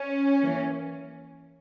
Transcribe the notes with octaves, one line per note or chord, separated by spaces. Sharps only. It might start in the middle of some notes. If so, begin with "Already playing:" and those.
Already playing: C#4
E3 A#3